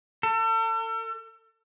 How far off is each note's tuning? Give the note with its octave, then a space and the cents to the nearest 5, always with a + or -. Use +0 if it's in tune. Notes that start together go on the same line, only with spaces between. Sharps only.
A4 +40